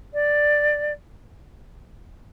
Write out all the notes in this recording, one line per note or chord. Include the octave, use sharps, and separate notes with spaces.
D5